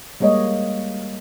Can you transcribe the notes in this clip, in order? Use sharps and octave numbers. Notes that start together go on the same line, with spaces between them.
G3 G#3 A#3 C#5 D#5